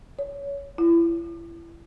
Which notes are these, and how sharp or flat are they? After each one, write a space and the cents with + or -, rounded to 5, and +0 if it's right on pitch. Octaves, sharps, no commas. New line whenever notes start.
C#5 +25
E4 +30